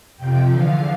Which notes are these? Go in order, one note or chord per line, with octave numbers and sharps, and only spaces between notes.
F2 C3 F3 G5
E2 D3 F3 F5